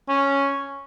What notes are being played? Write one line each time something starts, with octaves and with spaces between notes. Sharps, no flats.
C#4